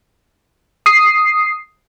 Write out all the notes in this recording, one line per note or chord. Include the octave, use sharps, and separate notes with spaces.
D#6 C7